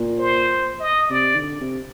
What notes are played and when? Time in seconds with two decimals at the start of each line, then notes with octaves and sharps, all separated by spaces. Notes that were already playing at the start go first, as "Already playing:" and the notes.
Already playing: A#2
0.19 C5
0.80 D#5
1.10 C3 D5
1.35 D#3
1.41 D3
1.61 C3